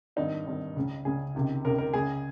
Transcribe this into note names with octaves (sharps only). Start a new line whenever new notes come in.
G#1 G2 D#3 D#4
G#1 G2 D#3
C#2 C#3
C#2 C#3 G#4
C#2 C3 D#3
C#2 C3 D#3 A#4
A#4
C#2 C#3 G#4